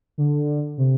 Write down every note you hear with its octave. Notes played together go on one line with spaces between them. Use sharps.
D3
C3